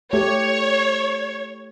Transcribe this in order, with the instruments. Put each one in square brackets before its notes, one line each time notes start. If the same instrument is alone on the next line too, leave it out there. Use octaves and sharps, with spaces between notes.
[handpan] A3 G4 [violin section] C#5